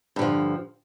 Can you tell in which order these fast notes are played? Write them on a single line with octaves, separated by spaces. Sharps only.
G2 D3 F3